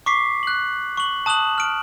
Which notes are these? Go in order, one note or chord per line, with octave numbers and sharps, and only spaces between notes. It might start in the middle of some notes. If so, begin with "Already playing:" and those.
C#6 D6 B6 C7
F#6 F#7
C#6 F#7
A5 D#6 F#6 E7 F#7
F6 D7